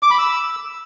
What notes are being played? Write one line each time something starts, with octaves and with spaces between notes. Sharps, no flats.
D6
B5
E6